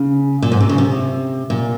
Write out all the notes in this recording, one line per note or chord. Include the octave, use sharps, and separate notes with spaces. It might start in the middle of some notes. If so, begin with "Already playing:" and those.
Already playing: C#3
A#2
G#2
C3
C#3
C3
A#2